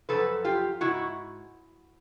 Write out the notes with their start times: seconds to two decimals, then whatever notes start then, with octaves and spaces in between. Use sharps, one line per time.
0.09 F#2 C#3 F3 A4 B4
0.45 F4 G4
0.81 D#3 E4 F#4
0.85 G#2